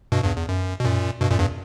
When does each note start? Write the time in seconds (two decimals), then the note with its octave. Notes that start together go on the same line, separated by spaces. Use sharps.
0.12 G2 B2
0.24 E2 G2
0.36 E2
0.49 F#2
0.80 B2
0.85 F#2 A#2
1.21 G2 B2
1.31 F#2 A#2
1.39 E2 G2